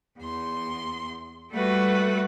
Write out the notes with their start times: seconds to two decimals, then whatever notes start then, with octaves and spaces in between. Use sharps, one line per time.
0.20 E2 C6
1.52 G3 A3 F#4 B4 F#5